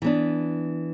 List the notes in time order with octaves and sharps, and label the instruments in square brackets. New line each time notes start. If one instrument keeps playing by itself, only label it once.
[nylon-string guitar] E3 B3 D4